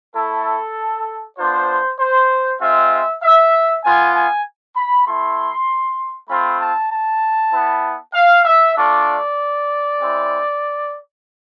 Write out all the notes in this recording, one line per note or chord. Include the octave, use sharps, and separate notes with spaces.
A3 E4 A4
B3 D4 F4 C5
C5
G#3 C4 F4 E5
E5
B3 F4 G#5
G#5
B5
A3 E4 C6
A3 C4 F4 B5
A5
A5
B3 E4
F5
E5
A3 D4 F4 D5
G#3 C4 E4